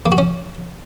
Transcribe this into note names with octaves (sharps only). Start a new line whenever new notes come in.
A#3
F#4
C#4